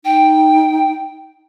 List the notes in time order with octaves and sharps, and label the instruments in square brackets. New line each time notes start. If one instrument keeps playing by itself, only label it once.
[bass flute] D#4 [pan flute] G5